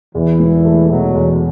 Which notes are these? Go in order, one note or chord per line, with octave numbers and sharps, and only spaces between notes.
E2 E3
E1
A3
B2 F#3
E2